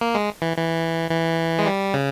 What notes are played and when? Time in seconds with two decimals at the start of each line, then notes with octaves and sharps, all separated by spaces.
0.01 A#3
0.15 G#3
0.42 E3
0.57 E3
1.11 E3
1.59 G#3
1.66 G3
1.94 C#3